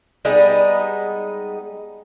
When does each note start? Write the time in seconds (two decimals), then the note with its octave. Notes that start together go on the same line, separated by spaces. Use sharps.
0.25 G3 G#3 B3 D#4